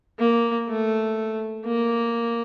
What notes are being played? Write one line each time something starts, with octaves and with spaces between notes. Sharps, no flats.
A#3
A3
A#3